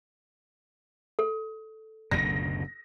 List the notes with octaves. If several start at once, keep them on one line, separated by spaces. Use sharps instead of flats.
A4
F#1 D2 B2 A#6